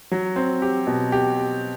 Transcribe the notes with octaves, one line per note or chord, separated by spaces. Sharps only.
F#3
C4
G4
B2
G4